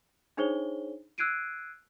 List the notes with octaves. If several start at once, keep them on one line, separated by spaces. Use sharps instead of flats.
D4 D#4 G#4 C5 C#5 G7
E6 F#6 G#6 C7 D7 D#7